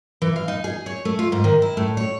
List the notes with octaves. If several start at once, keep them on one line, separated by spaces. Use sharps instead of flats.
E3
F5
D#4
G#4
C#5
A3
F4
G#2
D#3
E4
A2
C#5